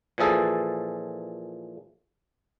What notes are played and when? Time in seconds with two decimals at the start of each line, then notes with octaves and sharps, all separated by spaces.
0.18 A#2 E3 F3 G#4 A4